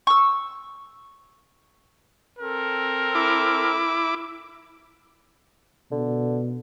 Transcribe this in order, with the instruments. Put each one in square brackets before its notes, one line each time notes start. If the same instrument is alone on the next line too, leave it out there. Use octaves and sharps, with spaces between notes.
[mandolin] C#6 E6
[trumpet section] C4 A4 A#4
[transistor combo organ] E4 D6
[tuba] B2 [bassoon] D3